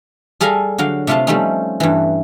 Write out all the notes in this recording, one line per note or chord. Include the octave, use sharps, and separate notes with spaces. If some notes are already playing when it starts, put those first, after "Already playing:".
G3 G#4 A4 F5 G#5 A#5
D3 F#3 F5
C3 A3 F4 F5 A5
F3 G3 A3 C4 C#4 D#4
G2 E3